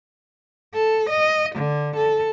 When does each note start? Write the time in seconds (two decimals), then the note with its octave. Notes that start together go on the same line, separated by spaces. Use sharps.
0.74 A4
1.10 D#5
1.56 D3
1.97 A4